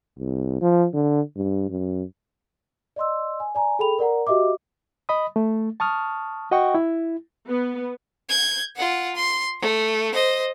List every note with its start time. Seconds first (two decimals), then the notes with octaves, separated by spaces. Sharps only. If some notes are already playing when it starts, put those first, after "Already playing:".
0.19 C2
0.61 F3
0.93 D3
1.36 G2
1.70 F#2
2.96 D5 D#5 C6 E6
3.40 G#5
3.55 D5 G#5 A#5
3.79 G#4 A4 G5 B5 F7
3.99 A#4 D5 F#5 A#5
4.27 F#4 G4 D#5 E5 D6
5.09 D#5 B5 D#6
5.36 A3
5.80 A5 C#6 D#6 F6
6.51 F#4 D#5 F#5 G5 C#6
6.75 E4
7.48 B3
8.29 G6 G#6
8.76 F4 F#5
9.16 C6
9.60 A3
10.13 C5 D#5